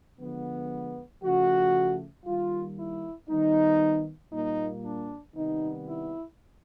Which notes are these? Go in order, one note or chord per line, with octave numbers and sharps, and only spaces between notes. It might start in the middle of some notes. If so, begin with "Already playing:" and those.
D3 F3 G#3 B3
C#3 F3 A3 F#4
D#3 G3 A#3 F4
E4
D#3 G3 B3 D#4
A#2 G3 A#3 D#4
D4
C3 D#3 G3 B3 D#4
E4